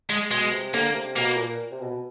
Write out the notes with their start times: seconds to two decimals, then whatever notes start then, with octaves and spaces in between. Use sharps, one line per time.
0.10 G#3
0.30 B2 G#3
0.52 C3
0.73 D3 A#3
0.94 C3
1.16 B2 A#3
1.37 A#2
1.72 C3
1.80 B2
1.91 B2